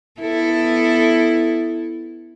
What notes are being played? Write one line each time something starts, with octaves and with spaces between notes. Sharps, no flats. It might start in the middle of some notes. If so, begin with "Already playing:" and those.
B3 E4 A4